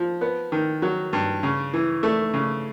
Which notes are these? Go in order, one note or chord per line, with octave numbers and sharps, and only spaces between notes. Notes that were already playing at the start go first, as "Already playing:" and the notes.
Already playing: F3
B3
D#3
F#3
G2
C#3
E3
A3
C#3